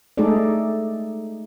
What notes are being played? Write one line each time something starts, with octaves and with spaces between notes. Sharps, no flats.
G#3 A3 D#4 G#4 A4 D5